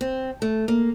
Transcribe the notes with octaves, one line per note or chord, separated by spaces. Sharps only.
C4
A3
A#3